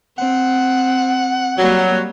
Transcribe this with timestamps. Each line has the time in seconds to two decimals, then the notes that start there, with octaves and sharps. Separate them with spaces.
0.18 C4 F#5
1.58 F#3 G3 A#3